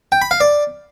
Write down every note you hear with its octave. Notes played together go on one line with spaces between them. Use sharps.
G5
B5
F5
D5